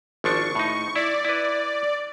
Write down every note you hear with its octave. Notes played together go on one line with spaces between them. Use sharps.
G#1 F3 D4 C#6
A2 D#4
E4 D5
E4 B4